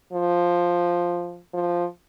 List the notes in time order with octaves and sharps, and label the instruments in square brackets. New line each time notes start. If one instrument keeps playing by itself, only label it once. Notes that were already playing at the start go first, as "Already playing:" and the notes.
[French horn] F3
F3